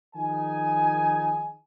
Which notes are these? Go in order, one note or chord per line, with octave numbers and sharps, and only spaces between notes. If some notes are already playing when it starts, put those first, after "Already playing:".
D#3 F3 D#4 G#4 G#5